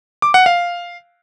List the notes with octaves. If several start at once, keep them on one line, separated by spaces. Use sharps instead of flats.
D6
F#5
F5